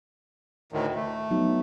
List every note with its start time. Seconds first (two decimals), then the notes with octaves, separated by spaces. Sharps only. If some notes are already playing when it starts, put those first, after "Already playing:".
0.73 D2 A2 D#3
0.95 A3
1.31 F#3 B3 D#4